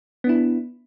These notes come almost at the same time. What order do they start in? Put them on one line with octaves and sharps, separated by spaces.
B3 D4 E4